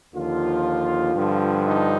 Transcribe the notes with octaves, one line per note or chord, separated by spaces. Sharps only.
D#2 D3 F3 F4
G2 D3 F3
D#4